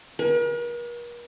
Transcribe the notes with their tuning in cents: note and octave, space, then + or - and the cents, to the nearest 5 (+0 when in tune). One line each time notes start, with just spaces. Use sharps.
A#4 +45